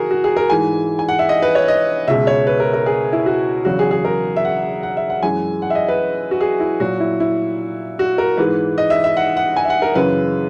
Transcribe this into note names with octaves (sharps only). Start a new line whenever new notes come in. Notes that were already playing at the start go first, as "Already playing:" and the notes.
Already playing: C#3 E3 F#4 G#4 A#4
F#4
G#4
A#4
G#2 E3 G#3 G#5
G#5
F#5
E5
D#5
B4
C#5
D#5
C#2 B2 G#3 E5
C#5
B4
A#4
A#4
G#4
E4
F#4
E2 C#3 F#3 F#4
G#4
G#4
A#4
E5
F#5
F#5
E5
F#5
F#2 E3 G#3 G#5
F#5
E5
D#5
B4
F#4
G#4
E4
A#2 F#3 F#4
E4
E4
F#4
A#4
G#2 E3 G#3 B4
D#5
E5
E5
F#5
F#5
G#5
E5
F#5
A#4
F#2 C#3 E3 B4